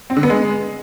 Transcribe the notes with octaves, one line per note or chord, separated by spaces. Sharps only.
C4
D3
B3
G#3